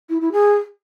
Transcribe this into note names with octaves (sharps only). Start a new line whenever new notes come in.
E4
E4
G#4